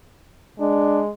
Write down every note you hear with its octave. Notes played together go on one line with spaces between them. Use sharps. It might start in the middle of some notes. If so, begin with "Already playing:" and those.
G#3 D4